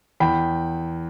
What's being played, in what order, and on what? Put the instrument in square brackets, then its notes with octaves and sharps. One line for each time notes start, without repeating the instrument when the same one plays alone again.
[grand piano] E2 G5 B5